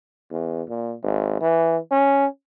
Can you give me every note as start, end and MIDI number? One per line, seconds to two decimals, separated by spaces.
0.31 0.62 40
0.69 0.95 46
1.03 1.40 32
1.41 1.77 52
1.91 2.26 61